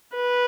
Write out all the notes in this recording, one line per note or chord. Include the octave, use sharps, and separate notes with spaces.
B4